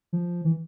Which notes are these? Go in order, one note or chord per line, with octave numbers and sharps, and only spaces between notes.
F3
E3